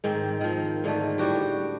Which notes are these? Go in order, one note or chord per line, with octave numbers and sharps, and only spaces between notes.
G#2 D#3 C4
D#3 F3
G#2 D3 D#3 A3
A2 G3 F#4 G4